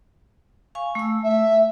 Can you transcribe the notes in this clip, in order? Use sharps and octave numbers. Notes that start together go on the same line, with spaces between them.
F5 G#5 C#6
A3 E6
E5